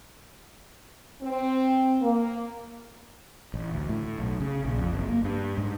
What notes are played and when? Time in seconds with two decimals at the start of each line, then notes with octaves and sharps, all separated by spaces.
1.22 C4
2.01 A#3
3.54 A1
3.74 D2
3.89 A2
4.19 B1
4.40 C#3
4.65 A#1
4.78 F2
4.93 F#1
5.08 A#3
5.24 G2
5.58 G#2